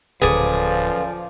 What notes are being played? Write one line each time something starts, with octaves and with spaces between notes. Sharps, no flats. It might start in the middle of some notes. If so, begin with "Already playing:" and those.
D1 F#2 C#3 F3 G#4 A4 B4 D5